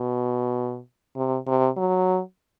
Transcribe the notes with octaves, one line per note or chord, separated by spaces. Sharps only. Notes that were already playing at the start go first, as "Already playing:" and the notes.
Already playing: B2
C3
C3
F#3